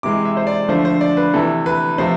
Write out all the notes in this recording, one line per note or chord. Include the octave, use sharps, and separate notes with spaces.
C3 E3 G#3 D6
E5
C5
D5
D3 F3 A3 C5
C5
D5
B4
C3 E3 A3 A4
B4
C3 F3 A3 C5